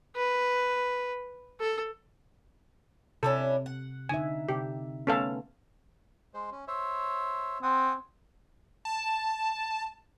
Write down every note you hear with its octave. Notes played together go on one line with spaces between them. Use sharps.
B4
A4
C3 C#4 D4 E4 A4
F#5
D3 D#4 E5 G#5
C3 G4
A3 B3 C#4 A4 B4 F5
G#3 C5
C#4
C5 C#5 E5
C4 F#5 G#5 D#6
A5